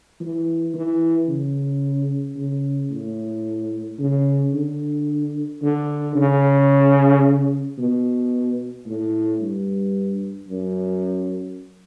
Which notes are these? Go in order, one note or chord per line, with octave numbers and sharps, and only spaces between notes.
E3
E3
C#3
C#3
A2
C#3
D3
D3
C#3
B2
A2
G2
F#2